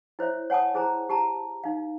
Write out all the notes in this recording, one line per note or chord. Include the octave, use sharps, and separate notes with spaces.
E4 C5 C#5 E5
C#5 F#5 G#5 A5 D#6
E4 G#4 C5 G#5 A#5
G4 A5 A#5
D#4 F5